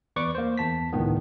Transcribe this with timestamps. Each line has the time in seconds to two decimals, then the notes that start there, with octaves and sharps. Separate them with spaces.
0.16 E2 B4 D5 C#6 D6
0.35 A#3 C5
0.58 E2 A5 B6
0.93 G#1 C#2 A2 D#3 B3